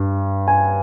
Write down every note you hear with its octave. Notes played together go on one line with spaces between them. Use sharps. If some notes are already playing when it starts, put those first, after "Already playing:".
Already playing: G2
G#5